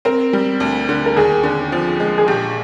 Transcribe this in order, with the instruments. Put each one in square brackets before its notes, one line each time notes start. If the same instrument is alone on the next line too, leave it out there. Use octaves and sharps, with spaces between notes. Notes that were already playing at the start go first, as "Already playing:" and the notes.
[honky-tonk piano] C4 [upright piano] A#4
[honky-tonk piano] G3
D2
D3
[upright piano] A#4
[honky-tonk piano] D#2 [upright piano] G#4
[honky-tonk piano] D3
F3
G#3
[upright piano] G#4
[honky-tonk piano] A#1 [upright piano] G4